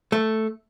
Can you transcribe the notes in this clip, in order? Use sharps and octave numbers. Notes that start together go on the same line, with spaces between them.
A3